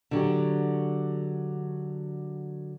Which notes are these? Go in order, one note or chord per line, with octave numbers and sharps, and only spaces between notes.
D3 F#3 G4